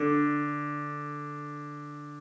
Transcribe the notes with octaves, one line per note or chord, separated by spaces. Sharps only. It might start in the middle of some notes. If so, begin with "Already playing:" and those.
Already playing: D3